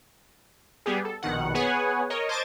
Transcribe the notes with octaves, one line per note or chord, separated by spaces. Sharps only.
G3 B3 G4 G#4
A4
A#1 B2 D#3 F#5
B3 G#4 B4 C#5 F#5 G#5
A#4 C#5 D#5
C5 D#5 A5 D6 G#6 A6